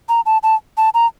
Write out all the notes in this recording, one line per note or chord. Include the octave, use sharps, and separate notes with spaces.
A#5
A5
A5
A5
A#5